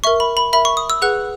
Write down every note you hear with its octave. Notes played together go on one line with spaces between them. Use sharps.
A#4 E5 C#6
B5
B5
A#4 E5 B5
C#6
D#6
E6
G#4 B4 F#5 F#6